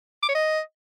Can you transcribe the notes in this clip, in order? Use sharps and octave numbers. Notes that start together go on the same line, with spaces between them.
D6
C#5
D#5